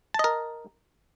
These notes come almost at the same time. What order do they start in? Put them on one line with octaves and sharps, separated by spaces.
A5 D#5 A#4